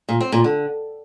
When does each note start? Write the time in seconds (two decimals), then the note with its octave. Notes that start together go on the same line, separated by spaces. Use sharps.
0.09 A#2
0.20 C4
0.32 A#2
0.44 D3